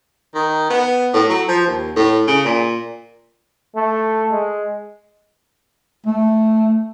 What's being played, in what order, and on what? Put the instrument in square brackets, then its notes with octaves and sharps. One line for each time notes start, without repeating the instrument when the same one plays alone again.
[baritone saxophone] D#3
B3
A2
F#3
F3
D#2
A2
C#3
A#2
[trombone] A3
G#3
[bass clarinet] A3